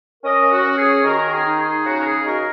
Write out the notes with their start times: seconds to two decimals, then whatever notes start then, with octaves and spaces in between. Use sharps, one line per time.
0.24 C#4 A#4 D#5
0.51 F#4
0.64 C#4
0.77 G#4
1.04 D#3 F#4 A#4
1.32 G#4
1.44 D#4
1.58 G#4
1.84 C#3 F#4
2.00 A#4
2.04 G#4
2.24 D#4 F#4 A#4